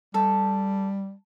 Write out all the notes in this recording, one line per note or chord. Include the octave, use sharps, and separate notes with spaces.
G3 A4